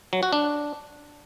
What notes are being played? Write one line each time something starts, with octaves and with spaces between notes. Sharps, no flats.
F#3
F#4
D4